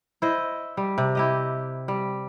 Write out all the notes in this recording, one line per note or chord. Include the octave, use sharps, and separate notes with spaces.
E4 C5 D#5
G3
C3
E4 G4 D#5
G3